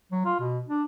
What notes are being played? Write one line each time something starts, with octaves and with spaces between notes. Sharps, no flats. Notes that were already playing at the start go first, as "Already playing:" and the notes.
F#3
F4
B2
D4